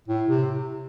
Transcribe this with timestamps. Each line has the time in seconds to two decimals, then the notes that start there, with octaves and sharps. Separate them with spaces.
0.08 A2
0.28 C3